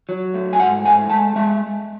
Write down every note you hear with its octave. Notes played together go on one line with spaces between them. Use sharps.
F#3
A3
G#5
G#2 F#5
A3 G#5
G#3 A5
G#3 E5